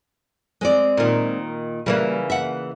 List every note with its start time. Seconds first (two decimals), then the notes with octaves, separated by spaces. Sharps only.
0.61 G#3 C4 D5
0.97 A#2 D#3
1.86 C#3 E3 G3 A#3
2.30 E5 F#5